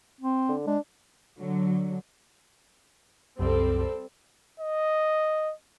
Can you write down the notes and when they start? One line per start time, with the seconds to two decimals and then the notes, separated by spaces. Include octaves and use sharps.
0.21 C4
0.49 D3
0.67 G#3 D4
1.39 D3 F#3
3.39 C2 F#2 G3 C4 A4
4.60 D#5